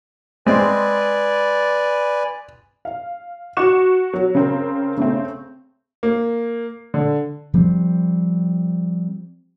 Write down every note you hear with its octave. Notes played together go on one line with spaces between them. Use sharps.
G#3 C4 B4 D5 G#5
F5
F#4 C#6 F#6 E7
F#3
C#3 C4 A#4
C#3 A3 C4
A#3
D3
F3 G3 B3 C4